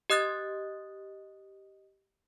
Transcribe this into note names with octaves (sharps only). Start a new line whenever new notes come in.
G4 D#5 D#6 F#6 A6